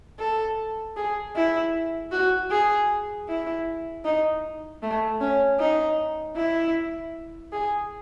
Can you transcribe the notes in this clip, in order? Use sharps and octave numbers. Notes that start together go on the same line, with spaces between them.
A4
G#4
E4
F#4
G#4
E4
D#4
A3
C#4
D#4
E4
G#4